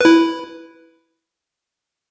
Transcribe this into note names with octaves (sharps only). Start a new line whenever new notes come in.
E4 B4